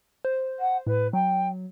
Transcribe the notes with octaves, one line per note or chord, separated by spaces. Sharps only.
C5
F#5
A2 B4
F#3 G5